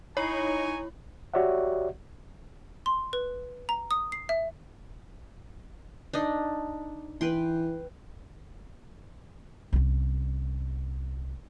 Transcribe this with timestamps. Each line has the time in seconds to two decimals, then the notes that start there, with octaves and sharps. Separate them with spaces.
0.17 D#4 E4 C#5 G#5 A#5 C#6
1.34 F#4 G4 C#5 D5 E5 F#5
2.86 C6
3.13 B4
3.69 A#5
3.91 D#6
4.12 C7
4.29 E5
6.14 D4 D#4 D#5
7.21 E3 B4 G5 C6
9.73 C2 C#4